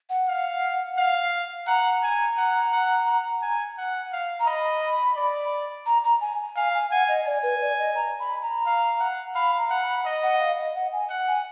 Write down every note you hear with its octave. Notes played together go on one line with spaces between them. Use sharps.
F#5
F5
F5
F#5 A#5
G#5
F#5
F#5
F#5
G#5
F#5
F5
A#5
D#5 B5
D5
A#5
A#5
G#5
F5 G#5
G#5
F#5 G#5
D#5
D5 G#5
B4
D5
D#5
A#5
B5
A#5
F5
F#5
F5 B5
A#5
F#5
B5
D#5
F#5
F5
D#5
F#5
G#5
F#5
G#5